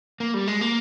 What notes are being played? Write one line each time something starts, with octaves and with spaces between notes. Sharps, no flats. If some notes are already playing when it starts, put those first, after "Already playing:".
A#3
G3
G#3
A#3